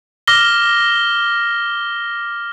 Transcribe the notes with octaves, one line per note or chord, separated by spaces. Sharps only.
D6 F6 A#6 G7